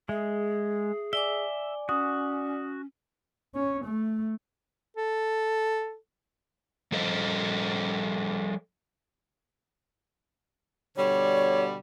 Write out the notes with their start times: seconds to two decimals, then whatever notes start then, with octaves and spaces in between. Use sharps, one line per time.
0.09 G#3 G#4 E5
1.13 D5 E5 G#5 D6 G7
1.89 C#4 F#4 D#6
3.55 C#4
3.85 A3
4.97 A4
6.92 F3 G3 A4 C5 D#5
10.97 B2 D3 G3 C#5